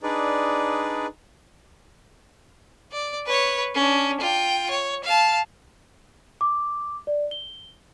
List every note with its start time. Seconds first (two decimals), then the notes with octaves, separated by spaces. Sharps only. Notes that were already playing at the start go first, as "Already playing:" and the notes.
0.03 D4 D#4 G#4 B4 D5
2.93 D5
3.26 B4 C#5
3.75 C#4 D4
4.20 F4 G5
4.70 C#5
5.04 F5 A5
6.41 D6
7.07 D5
7.31 G7